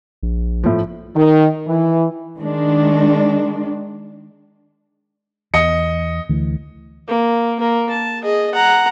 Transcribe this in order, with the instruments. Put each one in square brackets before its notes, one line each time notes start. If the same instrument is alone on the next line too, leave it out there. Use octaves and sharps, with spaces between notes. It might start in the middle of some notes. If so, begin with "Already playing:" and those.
[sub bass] A#1
[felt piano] A2 F3
[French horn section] D#3
E3
[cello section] D#3 G#3 D4
[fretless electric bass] E2 [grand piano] D#5 C#7
[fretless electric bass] D2 E3
[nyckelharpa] A#3
A#3 A#4
A5
G#4 D#5
F#5 A#5